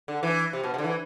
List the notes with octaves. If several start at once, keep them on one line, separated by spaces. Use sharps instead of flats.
D3
E3
C3
B2
C3
D3
E3